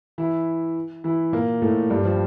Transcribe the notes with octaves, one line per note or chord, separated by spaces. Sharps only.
E3 E4
E3 E4
A#2 A#3
A2 A3
G2 G3
F3